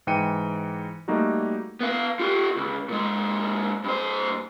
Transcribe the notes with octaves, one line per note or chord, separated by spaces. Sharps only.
G#2 E3 G5 C#7 D#7
G3 A3 A#3 D#4 F#4
B3 F5
F4 G4
C#2
A#2 G#3
G2 C5